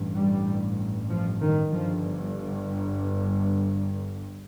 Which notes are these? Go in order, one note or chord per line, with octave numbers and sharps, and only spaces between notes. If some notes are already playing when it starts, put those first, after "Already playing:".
Already playing: A1 G2
G3
F3
D#3
G1 G2 F3